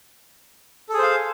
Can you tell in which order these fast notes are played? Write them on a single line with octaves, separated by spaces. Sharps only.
A4 G#4 C5 F5